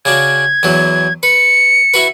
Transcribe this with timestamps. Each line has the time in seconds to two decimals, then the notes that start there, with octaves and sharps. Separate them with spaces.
0.05 C#3 D4 F#4 G#6
0.63 E2 E3 F#3
1.23 B4 C#7
1.94 E4 F#4 B4